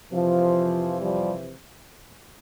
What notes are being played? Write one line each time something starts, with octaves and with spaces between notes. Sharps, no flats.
F2 C3 E3 F3
F3 G3